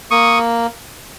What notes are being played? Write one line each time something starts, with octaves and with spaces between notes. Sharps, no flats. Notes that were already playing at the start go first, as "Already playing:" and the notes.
A#3 C#6 D#6